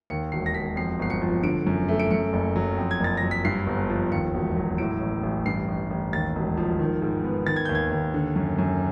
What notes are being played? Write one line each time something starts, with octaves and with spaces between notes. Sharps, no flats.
D#2 C#7
E1 C7
A#6
E1 B6
F2 C7
G1 C7
C#7
F3
D3 D7
F#2
A3
D7
F#2 C#7
F#1
F#3
F2
G#6
F#1 A6
A#6
F#3
B6
G2 C7
G1
F3
D#2 C#7
E1
F#3
A2 D7
A1
A1
G2 C7
A1
A1
D#2 A6
E1
F3
D#3
G#2
B3
D#3 A6
G#6
D#2 G6
G#6
D#2
D3
F#2
F#2